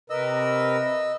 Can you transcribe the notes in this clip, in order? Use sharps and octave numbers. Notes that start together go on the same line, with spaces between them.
C3 A#4 B4 D#5 E6